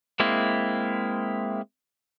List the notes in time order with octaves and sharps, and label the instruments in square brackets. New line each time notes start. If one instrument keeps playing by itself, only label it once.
[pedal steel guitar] G#3 A#3 C4 E4